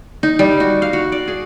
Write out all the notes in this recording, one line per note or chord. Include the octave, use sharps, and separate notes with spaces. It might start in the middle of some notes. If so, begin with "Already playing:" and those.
D#4
G3
F#4
F5
F#4
D5
G#4